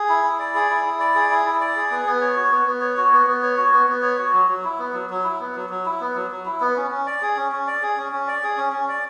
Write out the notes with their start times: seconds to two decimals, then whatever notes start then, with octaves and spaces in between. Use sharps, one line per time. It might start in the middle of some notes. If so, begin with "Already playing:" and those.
Already playing: G#4
0.09 E4
0.24 E4
0.39 D5
0.55 G#4
0.70 E4
0.85 E4
0.99 D5
1.15 G#4
1.31 E4
1.45 E4
1.61 D5
1.76 G#4
1.91 B3
2.06 B3
2.21 C#5
2.36 F#4
2.51 B3
2.66 B3
2.81 C#5
2.97 F#4
3.13 B3
3.27 B3
3.43 C#5
3.57 F#4
3.73 B3
3.88 B3
4.03 C#5
4.18 F#4
4.33 F#3
4.48 F#3
4.64 E4
4.79 B3
4.93 F#3
5.10 F#3
5.24 E4
5.39 B3
5.55 F#3
5.70 F#3
5.86 E4
6.00 B3
6.16 F#3
6.31 F#3
6.46 E4
6.61 B3
6.76 C#4
6.91 C#4
7.06 D5
7.22 G#4
7.37 C#4
7.52 C#4
7.67 D5
7.82 G#4
7.97 C#4
8.12 C#4
8.28 D5
8.43 G#4
8.57 C#4
8.73 C#4
8.88 D5